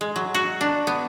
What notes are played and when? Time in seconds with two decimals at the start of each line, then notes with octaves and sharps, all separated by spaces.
0.01 G#3
0.16 F#3
0.34 F#4
0.61 D4
0.87 B3